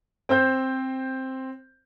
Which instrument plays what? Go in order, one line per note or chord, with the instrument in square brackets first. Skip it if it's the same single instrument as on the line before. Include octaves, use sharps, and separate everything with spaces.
[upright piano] C4 C5 G6